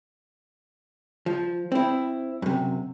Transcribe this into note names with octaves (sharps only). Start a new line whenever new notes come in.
F3
C4 E4
F#2 C3